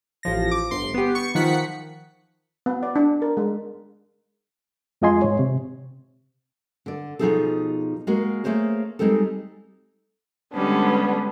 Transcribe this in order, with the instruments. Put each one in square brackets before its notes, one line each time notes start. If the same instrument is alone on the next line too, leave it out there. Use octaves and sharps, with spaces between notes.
[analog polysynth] A1 F3 A#6
D6
G1 C6 C7
B3 G4
C#6 C#7
D#3 F3 F#5 B6 C#7
[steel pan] B3
D5
D4
A#4
G#3
[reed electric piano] F2 G#3 F4 D#5 G#5 C6
G#2 C#5
C3
[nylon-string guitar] D3 D5
B2 E3 F3 D#4 G#4 A4
G#3 A#3 F#4 A#4
A3 A#3 G#4 C5 C#5
G3 G#3 C4 D#4 A4
[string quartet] D3 G3 G#3 B3 C#4 D4